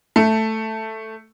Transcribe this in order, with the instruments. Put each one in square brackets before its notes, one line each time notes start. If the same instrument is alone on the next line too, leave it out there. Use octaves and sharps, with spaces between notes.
[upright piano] A3